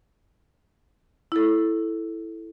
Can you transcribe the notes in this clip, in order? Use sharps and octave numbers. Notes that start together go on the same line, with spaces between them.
E4 A4